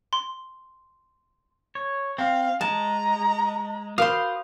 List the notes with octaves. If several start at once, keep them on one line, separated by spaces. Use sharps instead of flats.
C6
C#5
C4 F5
G#3 A5 A#5
F#4 A#4 C5 F5 B5 D#6